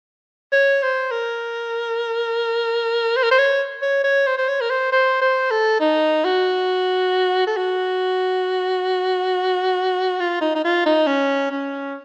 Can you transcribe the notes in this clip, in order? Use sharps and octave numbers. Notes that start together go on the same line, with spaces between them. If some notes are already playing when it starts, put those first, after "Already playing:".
C#5
C5
A#4
C5
A#4
C5
C#5
C#5
C#5
C5
C5
C#5
A#4
C5
C5
C5
A4
D#4
F#4
A4
F#4
F4
D#4
D#4
F4
D#4
C#4
C#4